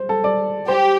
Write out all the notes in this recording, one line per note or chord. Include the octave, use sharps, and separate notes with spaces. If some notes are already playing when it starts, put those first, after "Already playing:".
Already playing: C5
A4
D5
G4 C5